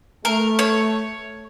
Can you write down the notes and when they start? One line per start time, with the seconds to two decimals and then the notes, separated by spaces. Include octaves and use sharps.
0.25 A3 A#4
0.59 C#5